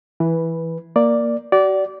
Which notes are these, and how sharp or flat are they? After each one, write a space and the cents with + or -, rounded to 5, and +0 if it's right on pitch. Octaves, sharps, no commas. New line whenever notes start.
E3 +0 B4 -10
A#3 +0 D5 +0
F#4 +40 D5 -20